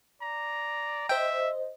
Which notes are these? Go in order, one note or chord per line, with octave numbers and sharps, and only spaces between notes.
D5 A#5
C5 D#5 E5 G5